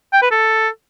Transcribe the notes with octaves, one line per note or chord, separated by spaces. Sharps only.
G5
B4
A4